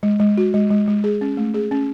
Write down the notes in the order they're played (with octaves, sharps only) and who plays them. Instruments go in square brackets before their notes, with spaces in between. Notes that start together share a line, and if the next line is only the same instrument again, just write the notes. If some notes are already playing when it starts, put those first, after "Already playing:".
[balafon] G#3
G#3
F#4
G#3
G#3
G#3
G#4
C#4
A3
G#4
C#4